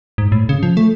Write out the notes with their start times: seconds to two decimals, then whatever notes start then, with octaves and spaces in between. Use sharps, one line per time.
0.18 G#2
0.32 A2
0.49 C#3
0.63 F3
0.77 A3